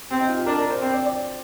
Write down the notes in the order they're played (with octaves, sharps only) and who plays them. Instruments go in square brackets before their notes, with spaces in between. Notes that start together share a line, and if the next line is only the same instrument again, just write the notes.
[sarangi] C4 [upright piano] G4
[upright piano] D#4
F4
G4
[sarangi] D4 [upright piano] A#4
[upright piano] A#4
C5
[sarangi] C4 [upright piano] C5
[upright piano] D5
D5